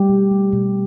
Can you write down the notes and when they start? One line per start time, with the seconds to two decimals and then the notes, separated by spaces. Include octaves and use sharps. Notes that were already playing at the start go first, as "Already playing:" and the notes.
Already playing: G3 A3 G4
0.09 B2
0.31 A3
0.53 B2